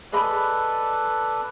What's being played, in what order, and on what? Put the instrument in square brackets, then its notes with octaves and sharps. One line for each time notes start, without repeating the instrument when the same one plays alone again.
[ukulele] G#4 D#5 B5 [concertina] A4 B4 D5